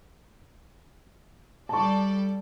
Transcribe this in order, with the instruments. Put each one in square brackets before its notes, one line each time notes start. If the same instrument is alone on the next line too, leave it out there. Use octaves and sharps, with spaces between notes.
[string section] G3 A4 D5 [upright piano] A5 C#6